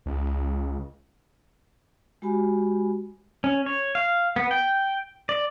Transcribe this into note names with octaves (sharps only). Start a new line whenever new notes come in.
C#2
G#3 F#4 G4 G#5 B5
C#4
C#5
F5
B3
G5
D5